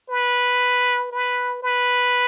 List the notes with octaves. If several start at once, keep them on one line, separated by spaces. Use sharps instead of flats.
B4
B4
B4